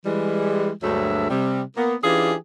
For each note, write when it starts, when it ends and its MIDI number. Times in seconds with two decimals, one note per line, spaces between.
0.05 0.70 52
0.05 0.70 55
0.05 0.70 56
0.82 1.26 38
0.82 1.26 43
0.82 1.26 54
0.82 1.26 56
0.82 1.26 57
0.82 1.26 76
1.30 1.62 48
1.30 1.62 55
1.77 1.95 58
1.77 1.95 59
2.03 2.34 52
2.03 2.34 61
2.03 2.34 62
2.03 2.34 65
2.03 2.34 67
2.03 2.34 68